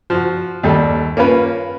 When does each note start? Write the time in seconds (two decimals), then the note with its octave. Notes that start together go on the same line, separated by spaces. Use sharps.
0.10 F3 F#4
0.63 D#2 G3 A4
1.17 A#3 C#4 F4 B4